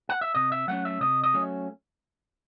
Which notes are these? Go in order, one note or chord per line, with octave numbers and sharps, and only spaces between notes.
F#5
E5
C3 D#5
E5
F#3 A3 C#4 F#5
E5
C3 D#5
D#5
F#3 A3 C#4